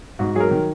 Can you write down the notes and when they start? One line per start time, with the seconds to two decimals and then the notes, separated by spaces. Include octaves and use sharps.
0.19 G#2 F#4
0.35 F#3 G#4
0.40 A#4
0.51 D#3